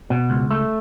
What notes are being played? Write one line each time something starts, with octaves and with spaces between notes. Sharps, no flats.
B2
C#2
A3